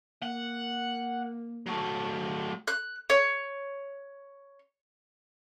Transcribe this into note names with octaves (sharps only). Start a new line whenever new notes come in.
A#3 F#5
F#3 A3
F#6
C#5